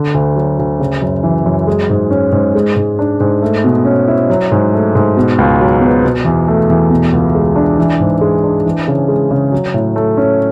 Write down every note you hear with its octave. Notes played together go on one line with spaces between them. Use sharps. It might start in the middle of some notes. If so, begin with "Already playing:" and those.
Already playing: D3
D2
F#3
D2
C#3
F#2
E3
F#2
G#3
G#2
C#4
G#2
G#3
G#2
D4
G#2
A3
B2
C#4
E4
F#3
G#2
A3
G#2
B2
C#2
F#3
B3
B2
E2
A3
E2
B2
C#2
G#3
D4
E3
G#2
G#3
D4
E3
C#3
G#3
C#3
F#3
A2
A3
C#4